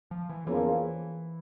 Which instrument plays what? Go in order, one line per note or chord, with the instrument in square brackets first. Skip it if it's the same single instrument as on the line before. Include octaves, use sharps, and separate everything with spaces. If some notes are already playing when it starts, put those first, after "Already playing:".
[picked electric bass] F3
E3
[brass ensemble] E2 C#3 F3 A#3 [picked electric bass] E3